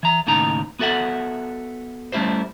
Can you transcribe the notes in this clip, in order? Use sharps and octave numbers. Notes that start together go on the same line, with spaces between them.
E3 A#5
D#2 A2 C#3 D#4 A#5
B3 F#4 A4 E5 F#5
G3 A3 C#4 E4 G4 C5